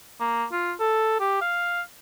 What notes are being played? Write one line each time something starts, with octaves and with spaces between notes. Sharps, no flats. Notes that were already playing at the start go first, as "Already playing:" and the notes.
A#3
F4
A4
G4
F5